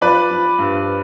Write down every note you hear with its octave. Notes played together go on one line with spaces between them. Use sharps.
F3 B4 D5
F3
G2